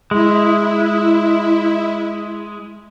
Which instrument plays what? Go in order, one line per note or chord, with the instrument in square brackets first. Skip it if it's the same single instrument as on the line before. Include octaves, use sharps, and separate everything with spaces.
[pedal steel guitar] G#3 [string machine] E4